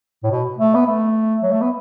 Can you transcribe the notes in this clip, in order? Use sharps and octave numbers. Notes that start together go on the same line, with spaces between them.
A2
B2
A3
B3
A3
F#3
A3
B3